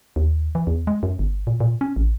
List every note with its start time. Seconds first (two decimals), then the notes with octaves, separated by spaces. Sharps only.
0.16 D#2
0.55 E3
0.67 E2
0.87 G#3
1.03 F#2
1.19 G1
1.47 A#2
1.60 A#2
1.81 C#4
1.96 A1